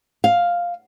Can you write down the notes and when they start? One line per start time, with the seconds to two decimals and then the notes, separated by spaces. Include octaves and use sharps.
0.24 F5